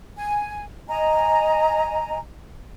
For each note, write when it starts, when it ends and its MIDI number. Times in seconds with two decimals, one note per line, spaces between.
0.16 0.62 80
0.89 2.18 75
0.89 2.18 80
0.89 2.18 82